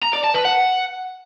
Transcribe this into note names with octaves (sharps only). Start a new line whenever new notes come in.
A#5
D5
A5
B4
F#5